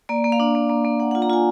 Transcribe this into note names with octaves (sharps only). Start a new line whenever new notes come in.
A#3 D5
A#3
F5
D4
A#3
A#3
A#3
A#3 F#5
F4 F#5
A#5
F4 G#5